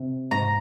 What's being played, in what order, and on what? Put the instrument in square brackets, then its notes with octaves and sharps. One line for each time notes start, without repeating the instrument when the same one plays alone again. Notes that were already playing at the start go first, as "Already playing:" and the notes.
Already playing: [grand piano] C3
[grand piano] G#2 [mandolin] A#5